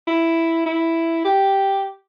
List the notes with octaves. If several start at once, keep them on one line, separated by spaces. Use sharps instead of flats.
E4
E4
G4